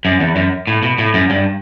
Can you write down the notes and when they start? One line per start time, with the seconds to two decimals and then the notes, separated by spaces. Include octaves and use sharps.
0.05 F#2
0.20 E2
0.36 F#2
0.67 A2
0.83 B2
0.98 A2
1.14 F#2
1.30 G2